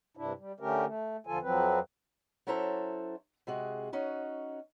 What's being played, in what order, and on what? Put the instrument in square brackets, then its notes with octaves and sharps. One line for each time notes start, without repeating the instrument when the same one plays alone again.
[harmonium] G2 C3 D4 E4
G3
D3 A3 C#4 G4 A#4
A3
E2 D3 F3 F4 A4 G#5
F2 F3 F#3 C4 B4
[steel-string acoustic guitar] F#3 C#4 E4 A4 C5 A#5
C3 G#3 F#4 G#4
C#4 D#4 F#4